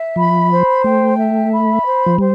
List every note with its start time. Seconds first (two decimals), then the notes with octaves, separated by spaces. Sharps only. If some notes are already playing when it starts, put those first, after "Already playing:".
Already playing: E5
0.16 F3 B5
0.51 C5
0.84 A3 G5
1.17 E5
1.52 B5
1.85 C5
2.06 F3
2.19 G3 C5